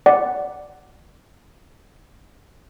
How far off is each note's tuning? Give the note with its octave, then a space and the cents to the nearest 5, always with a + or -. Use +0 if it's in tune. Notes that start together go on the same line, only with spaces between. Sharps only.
D5 +0 F#5 +0